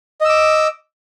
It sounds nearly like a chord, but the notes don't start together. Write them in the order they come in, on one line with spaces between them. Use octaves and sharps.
D#5 E6 D6